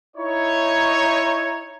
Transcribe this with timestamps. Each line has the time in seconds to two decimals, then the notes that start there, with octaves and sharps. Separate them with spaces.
0.16 D#4 E4 C#5